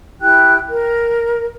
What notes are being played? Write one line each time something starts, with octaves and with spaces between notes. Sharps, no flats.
E4 G4 G5 F#6
A#4